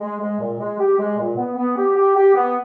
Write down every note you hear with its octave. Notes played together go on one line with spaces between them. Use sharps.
G#3
G#3
A#2
G#3
G4
G#3
A#2
B3
B3
G4
G4
G4
B3